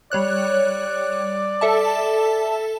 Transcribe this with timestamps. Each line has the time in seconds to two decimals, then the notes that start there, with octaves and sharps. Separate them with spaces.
0.12 G3 C#5 D5 F#6
1.61 A4 E5 A5